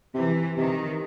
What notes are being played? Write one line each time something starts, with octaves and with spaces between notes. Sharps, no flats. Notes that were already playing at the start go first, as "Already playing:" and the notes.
C3 E3
C3 D#3